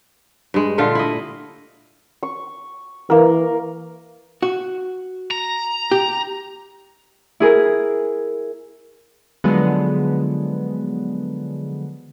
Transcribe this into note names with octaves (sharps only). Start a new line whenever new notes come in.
G2 G#3
A#2 D3 A3 F4
E4 D#5
C#6
E3 A#3 A#4
F#4
A#5
G4
E4 G#4 A#4
D3 F3 F#3 G#3 B3